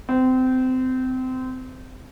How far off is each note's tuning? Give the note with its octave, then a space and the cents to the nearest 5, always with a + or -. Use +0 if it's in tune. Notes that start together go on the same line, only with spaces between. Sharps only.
C4 -25